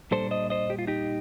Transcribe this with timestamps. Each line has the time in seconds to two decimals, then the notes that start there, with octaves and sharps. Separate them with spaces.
0.11 A#2 G3 D4 A4 C5
0.31 C5 D#5
0.50 C5 D#5
0.70 G4
0.79 F4
0.87 D#4 G4